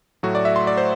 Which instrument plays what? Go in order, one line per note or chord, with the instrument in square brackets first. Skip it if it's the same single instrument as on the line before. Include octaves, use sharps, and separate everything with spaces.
[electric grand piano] A2 F#3 A3 F#4
D5
E5
C6
D5
C5